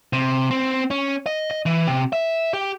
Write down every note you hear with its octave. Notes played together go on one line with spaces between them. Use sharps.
C3
C4
C#4
D#5
D#5
E3
C3
E5
G4